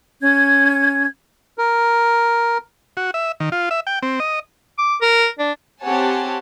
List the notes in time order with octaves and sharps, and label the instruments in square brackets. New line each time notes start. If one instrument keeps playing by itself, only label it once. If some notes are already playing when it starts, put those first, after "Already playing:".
[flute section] C#4 G#6
[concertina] A#4
[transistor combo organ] F#4
E5
D#3
F4
E5
G5
C4
D#5
[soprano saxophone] D6
A#4
D4
[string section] C4 G4 C#5 F#5 G#5 A5